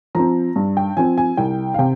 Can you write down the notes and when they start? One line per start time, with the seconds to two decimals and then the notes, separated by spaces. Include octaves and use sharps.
0.15 F3 C4 A#5
0.56 G2
0.77 G5
0.97 F3 C4 G#5
1.18 G#5
1.37 C2 G5
1.74 F5
1.79 C3 G5